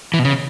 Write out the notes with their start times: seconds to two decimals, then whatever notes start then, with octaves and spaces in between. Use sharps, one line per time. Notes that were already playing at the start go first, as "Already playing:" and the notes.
0.14 E3
0.19 B2
0.25 C#3